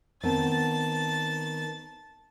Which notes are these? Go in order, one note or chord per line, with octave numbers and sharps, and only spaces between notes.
D#3 B3 C4 A5 A6